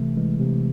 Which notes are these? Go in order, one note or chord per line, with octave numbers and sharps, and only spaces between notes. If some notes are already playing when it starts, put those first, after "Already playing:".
Already playing: C3 E3 A3
E3 G#3
C3